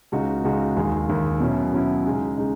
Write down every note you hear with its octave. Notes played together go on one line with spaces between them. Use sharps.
C#2 C#3 G#3 D#4 F#4
C#2 C#3 G#3 D#4 F#4
D#2 D#3 G#3
D#2 D#3 G#3
B2 F#3 C#4 E4
B2 F#3 C#4 E4
C#3 G#3 D#4
C#3 G#3 D#4